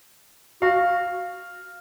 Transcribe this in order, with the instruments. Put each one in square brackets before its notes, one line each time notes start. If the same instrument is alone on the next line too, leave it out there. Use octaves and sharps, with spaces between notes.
[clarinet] F#4 [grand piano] F5